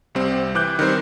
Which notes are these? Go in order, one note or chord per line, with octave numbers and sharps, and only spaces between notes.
C2 G3 C4
E3 D6 F#6 G6
D#3 G3 C4 C5